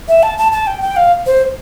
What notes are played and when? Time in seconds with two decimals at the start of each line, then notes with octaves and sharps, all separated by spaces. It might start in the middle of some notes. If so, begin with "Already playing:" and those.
0.08 E5
0.23 A5
0.38 A5
0.52 A5
0.67 G5
0.82 G5
0.96 F5
1.26 C5